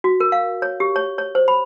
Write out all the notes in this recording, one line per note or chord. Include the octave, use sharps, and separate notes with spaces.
F#4
A#4
F5
C#5
G4
C#5
C#5
C5
B5